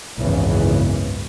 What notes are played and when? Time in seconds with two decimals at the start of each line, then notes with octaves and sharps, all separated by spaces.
0.17 G#1 C#2 F#2 C#3 E3 B3